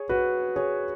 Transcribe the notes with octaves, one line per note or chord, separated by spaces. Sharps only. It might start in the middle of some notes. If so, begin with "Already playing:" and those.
Already playing: G#4 C#5
F#4 B4
G#4 C#5